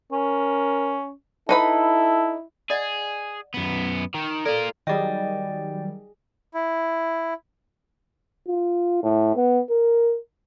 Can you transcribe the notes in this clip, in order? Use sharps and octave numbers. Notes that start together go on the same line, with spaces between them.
C#4 A#4
D#4 E4 A4 B4 B5
G#4 D5 D#5 F#5
F#2 B3
D#3
F4 A4 A#4 D5
D#3 F#3 G3 G#4 D5 D#5 G5
E4
F4
A2
B3
A#4